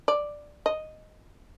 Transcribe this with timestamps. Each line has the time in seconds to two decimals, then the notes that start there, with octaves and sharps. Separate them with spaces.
0.08 D5
0.66 D#5